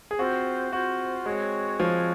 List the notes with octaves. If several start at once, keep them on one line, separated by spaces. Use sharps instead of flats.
G#4
C4 F4 F#4 C5
C4 F4 F#4 C5
G#3 C4 F#4 C#5
F3 C4 F#4 C#5